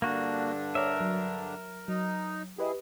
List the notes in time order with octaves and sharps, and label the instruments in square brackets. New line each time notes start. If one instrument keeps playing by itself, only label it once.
[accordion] G2 D3 D4 [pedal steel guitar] A#3 F#4
[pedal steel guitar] A#4 E5 [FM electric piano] C#5 D5
[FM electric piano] F#3
[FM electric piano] F#3 [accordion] D#4
[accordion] E4 G#4 [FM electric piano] G4 B4 D#5